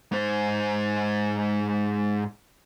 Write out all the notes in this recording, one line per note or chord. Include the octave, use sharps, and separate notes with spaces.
G#2 C5